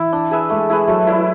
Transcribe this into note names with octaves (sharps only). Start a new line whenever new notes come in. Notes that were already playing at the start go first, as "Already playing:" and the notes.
Already playing: E3 E4
D4
G#4 B4 E5
G#3 A3
E4 G#4 B4
F#3 A3
E4 B4 D5